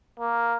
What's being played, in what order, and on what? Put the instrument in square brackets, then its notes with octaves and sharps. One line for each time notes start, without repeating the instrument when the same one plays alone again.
[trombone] A#3